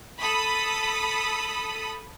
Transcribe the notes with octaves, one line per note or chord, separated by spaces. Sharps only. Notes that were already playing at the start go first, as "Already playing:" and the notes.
A4 B5 D#6